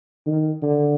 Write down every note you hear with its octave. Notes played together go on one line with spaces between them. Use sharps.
D#3
D3